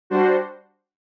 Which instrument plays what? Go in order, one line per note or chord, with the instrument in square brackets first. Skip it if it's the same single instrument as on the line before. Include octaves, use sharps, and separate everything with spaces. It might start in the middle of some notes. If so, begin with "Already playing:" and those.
[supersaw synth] G3 D4 F#4 C5